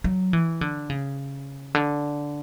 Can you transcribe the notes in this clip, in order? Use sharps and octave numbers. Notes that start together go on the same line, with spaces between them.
F#3
E3
D3
C#3
D3